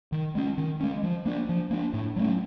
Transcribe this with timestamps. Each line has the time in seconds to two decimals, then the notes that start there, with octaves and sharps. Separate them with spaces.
0.12 D#3
0.35 G#3 C#4
0.58 D#3
0.80 G#3 C#4
1.03 F3
1.26 A#3 D4
1.49 F3
1.71 A#3 D4
1.93 A2
2.16 F#3 A3 C#4